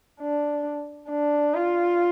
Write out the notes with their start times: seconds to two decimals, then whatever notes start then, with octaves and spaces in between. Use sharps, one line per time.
0.21 D4
1.10 D4
1.54 F4